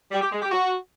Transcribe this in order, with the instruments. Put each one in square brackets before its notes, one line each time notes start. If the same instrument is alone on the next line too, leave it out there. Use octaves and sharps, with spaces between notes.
[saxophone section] G3
G4
G#3
G4
F#4